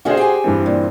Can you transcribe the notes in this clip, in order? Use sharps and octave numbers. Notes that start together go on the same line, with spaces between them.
D3 C4 C#4 F#4 G#4 C5
G4 G5 G#5
G2 E3 C4
A#2